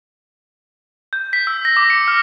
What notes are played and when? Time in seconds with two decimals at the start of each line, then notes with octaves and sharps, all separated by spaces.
1.13 G6
1.33 B6
1.47 E6
1.65 A#6
1.77 D6
1.90 C#7
2.08 F6